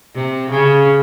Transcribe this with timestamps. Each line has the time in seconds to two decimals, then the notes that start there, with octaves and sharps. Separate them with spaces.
0.15 C3
0.50 C#3